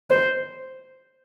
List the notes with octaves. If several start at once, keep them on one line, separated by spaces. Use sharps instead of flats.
C5